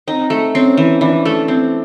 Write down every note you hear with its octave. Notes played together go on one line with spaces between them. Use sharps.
C4 D#4
A3
C4 C#4
E3
E3 D4
A3
C4